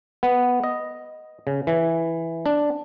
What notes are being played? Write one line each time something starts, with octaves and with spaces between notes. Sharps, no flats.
B3
D#5
C#3
E3
D4